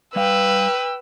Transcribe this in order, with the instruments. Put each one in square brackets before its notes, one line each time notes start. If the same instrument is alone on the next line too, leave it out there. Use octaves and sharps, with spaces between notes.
[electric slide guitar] G3 F5 [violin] B4 [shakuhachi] G5 [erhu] E6